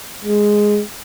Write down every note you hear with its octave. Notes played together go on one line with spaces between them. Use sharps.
G#3